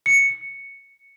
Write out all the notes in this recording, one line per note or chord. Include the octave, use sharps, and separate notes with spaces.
C#7